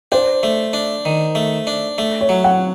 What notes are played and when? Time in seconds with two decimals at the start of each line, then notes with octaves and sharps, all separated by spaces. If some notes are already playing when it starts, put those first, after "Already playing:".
0.12 D4 C5
0.43 A3
0.73 D4
1.05 D#3
1.35 A3
1.67 D4
1.98 A3
2.21 C#5
2.29 F#3
2.44 F#5